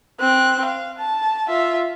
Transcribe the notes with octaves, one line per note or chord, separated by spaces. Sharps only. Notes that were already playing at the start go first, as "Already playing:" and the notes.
C4 F#6
F5
A5
F4 E5